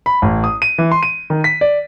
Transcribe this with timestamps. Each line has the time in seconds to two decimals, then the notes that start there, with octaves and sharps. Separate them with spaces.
0.06 B5
0.22 A1
0.44 D#6
0.62 D#7
0.78 E3
0.91 C6
1.03 D#7
1.30 D#3
1.44 B6
1.61 D5